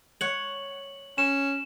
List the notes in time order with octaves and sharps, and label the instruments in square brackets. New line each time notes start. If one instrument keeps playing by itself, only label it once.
[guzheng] C#5 F#5 [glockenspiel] F#7
[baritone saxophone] C#4 [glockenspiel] E7